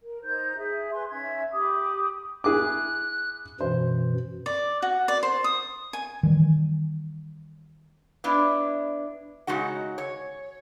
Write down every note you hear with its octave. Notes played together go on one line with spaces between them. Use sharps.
A#4
D#4 C5 G6
G#4 E5
B4 G#5 C6
C#4 D#4 E5 G#6
G4 B5 D6 D#6
E4 G#4 D6 F#6
F#2 B2 E3 C5
D5
F#4
D5
C5
D#6
G#5
D#3 E3 G3
B3 D4 E4
C#3 G#3 D#4 F#4 F#5
C#5